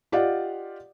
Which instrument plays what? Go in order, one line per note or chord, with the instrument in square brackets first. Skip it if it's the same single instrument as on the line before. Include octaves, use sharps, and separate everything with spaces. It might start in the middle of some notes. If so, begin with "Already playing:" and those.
[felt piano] F4 G4 D5 D#5 F5 F#5